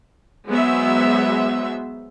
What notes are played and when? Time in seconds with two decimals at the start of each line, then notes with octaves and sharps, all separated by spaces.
0.49 F#3 G#3 B3 C5 E5